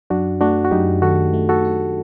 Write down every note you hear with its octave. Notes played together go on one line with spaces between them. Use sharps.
F#2 D4 F#4
A3 D4 F#4
F#4
F#2 D#4 G4
D#3 F#4 A4
A3
F#4 A4
D4